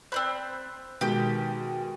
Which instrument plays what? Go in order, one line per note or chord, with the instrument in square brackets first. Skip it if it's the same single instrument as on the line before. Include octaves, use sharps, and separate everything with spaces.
[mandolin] C4 D5 F#6 [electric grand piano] C5 B5 G6
[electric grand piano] B2 D#3 G#3 [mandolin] G4 G5